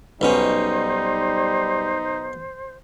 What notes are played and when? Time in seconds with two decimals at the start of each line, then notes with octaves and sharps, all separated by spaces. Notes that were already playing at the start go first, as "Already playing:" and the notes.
0.21 B1 B2 G3 C#4 D#4 C5